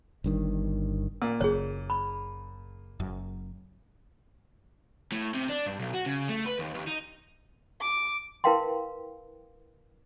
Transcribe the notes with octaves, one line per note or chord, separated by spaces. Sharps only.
G1 G2 D#3
A#2
F#1 F#2 C#3 G#4 C#5
B5
F#1 F#2
A2
C3
D4
G2
B1
F#4
C#3
A3
B4
D#2
D#2
D#4
D6
E4 A#4 B4 F5 G5 C6